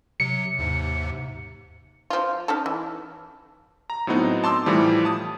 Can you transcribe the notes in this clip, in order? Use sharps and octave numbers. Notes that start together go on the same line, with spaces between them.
C3 F#3 C#7
D#2 G#2 C3
F3 F4
C#4 D#4 A4
E3
A#5
A2 F#3 B3 C4 D#4
A5 C6 D6 E6
A2 E3 F3 G3
A5 D#6